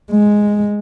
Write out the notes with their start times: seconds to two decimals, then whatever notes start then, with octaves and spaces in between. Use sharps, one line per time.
0.12 G#3